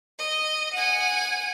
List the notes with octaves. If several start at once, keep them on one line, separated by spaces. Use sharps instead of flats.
D#5
F#5 G#5